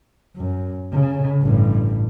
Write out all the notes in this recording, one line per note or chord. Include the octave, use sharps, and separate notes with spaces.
F#2
C#3
A1 G2